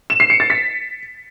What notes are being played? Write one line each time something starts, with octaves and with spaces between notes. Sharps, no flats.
E7
C7
C#7
A6
B6